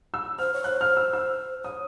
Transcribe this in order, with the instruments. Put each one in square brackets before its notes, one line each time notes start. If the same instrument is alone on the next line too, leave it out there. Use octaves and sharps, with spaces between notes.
[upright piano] E6
[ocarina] C5 [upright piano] F6
[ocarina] C#5
[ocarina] C5 [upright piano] F#6
[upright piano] F6
E6
E6
[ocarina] C#5 [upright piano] D#6